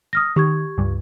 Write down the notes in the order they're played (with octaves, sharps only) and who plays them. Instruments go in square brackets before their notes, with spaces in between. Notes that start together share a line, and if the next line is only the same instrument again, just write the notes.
[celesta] D#6 F6 A#6
[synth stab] D#3 [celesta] G4 C#6 G#6
[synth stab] C#2 G2